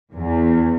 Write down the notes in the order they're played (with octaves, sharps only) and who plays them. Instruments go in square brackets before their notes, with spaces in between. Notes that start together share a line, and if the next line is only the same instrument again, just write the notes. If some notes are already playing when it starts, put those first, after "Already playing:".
[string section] E2